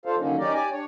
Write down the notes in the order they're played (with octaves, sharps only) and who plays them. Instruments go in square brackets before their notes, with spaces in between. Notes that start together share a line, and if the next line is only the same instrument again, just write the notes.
[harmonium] D4 F4 A4 C5 F5
D3 D#3 F#3 A#3 C#4 D#4
C#4 D#4 G4 A#4 D5
G4 D5 G#5
D4 C#5